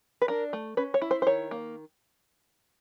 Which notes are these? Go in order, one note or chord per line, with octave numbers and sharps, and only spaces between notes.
B4
D4 A#4
A3
C#4 B4
C#5
E4
C5
C5
D#3 C#5
A#3